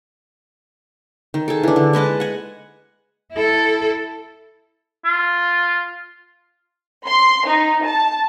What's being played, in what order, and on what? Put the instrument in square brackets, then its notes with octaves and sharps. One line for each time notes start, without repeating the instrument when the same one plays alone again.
[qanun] D#3
G#4 A4
E3 D4
D3
G#3 B4 D#5 A5
F#5 G#5
[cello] E4 A4
[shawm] F4
[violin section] C6
D#4
A5